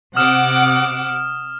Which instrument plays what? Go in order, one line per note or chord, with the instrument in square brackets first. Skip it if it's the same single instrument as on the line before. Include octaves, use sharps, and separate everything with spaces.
[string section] C3 F#5 D6 [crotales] D#6 F6 E7